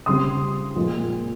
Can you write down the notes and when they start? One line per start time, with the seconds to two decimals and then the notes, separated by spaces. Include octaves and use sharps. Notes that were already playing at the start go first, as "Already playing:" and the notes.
0.06 C#3 G3 C4 C6 D#6
0.76 A#2 F3 G#3